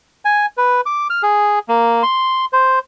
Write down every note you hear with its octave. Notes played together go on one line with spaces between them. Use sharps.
G#5
B4
D6
F6
G#4
A#3
C6
C5